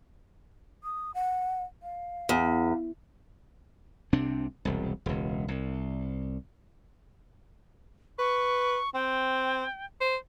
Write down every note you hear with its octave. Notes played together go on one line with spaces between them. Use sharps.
D#6
F#5
F5
E2
C2 C3 C4 D4
E1 C2
E1 C#2
C2
B4 C#6
C4 G5
C5